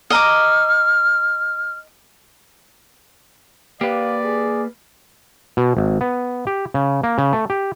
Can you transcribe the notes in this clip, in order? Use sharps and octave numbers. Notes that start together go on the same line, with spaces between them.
D#5 A#5 D6 F6
A#3 G4 B4 D5 F5
G#4
B2
G#1
B3
G4
C#3
A#3
C#3
A3
G4